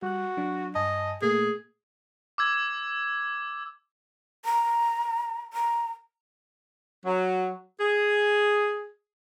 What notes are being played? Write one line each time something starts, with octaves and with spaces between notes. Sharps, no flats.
G3 F#4 F#6
F#3 D4
G2 D#5 G#5 A5
A#2 A3 A#3 G#4
D6 E6 G#6
A#5
A#5
F#3
G#4